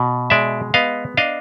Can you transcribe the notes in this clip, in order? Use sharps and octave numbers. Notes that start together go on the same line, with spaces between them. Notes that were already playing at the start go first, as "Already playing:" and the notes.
Already playing: B2
G#3 D5 E5
B3 D#5 F5
D4 D#5 F5